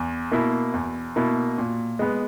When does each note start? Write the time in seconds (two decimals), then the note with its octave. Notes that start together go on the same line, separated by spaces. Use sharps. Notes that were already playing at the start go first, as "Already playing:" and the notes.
Already playing: E2
0.32 B2 A#3 E4
0.74 E2
1.16 B2 A#3 E4
1.58 A#2
1.99 G#3 B3